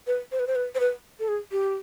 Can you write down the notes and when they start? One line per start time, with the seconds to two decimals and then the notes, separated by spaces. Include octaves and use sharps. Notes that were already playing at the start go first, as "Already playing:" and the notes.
0.07 B4
0.32 C5
0.39 B4
0.47 C5
0.55 B4
0.75 C5
0.80 B4
1.20 A4
1.28 G#4
1.52 G4